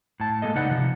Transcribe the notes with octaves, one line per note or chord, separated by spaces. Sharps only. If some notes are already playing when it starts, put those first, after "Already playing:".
A2 A5
G#3 A#3 A4 D#5
C#3 D#4 B4 D5 F#5
C3 F3